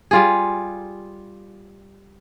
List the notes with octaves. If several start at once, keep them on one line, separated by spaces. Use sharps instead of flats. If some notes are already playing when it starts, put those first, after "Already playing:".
G3 F4 G#4